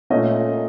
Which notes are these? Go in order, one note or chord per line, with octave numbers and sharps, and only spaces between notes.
A#2 A3 C#4 D#5